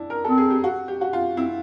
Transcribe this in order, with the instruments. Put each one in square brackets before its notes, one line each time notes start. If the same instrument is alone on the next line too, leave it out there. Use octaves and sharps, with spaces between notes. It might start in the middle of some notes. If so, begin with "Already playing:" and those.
Already playing: [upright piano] D4 E4
A#4
[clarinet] C4 [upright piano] A4
[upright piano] G#4
G4
F#4
G4
F#4
F4
[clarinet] C4 [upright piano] E4